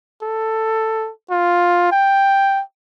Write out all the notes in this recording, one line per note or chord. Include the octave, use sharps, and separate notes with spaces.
A4
F4
G5